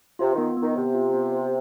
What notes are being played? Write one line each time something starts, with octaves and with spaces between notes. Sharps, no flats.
C3 F4
D#3 B3
D#3 B3
C3 C5
F4
B3
C5